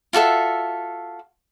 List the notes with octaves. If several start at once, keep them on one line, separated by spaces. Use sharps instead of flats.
F4 F#4 A4 E5